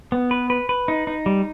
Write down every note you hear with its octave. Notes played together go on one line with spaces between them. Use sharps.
B3
B4
B4
B4
D#4
D#4
G3